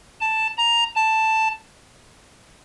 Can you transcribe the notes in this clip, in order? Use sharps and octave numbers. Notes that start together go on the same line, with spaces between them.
A5
A#5
A5